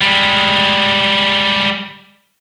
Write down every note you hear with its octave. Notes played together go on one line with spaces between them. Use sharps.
G3 G#3